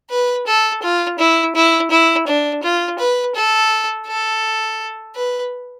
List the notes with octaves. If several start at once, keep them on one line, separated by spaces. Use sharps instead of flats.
B4
A4
F4
E4
E4
E4
D4
F4
B4
A4
A4
B4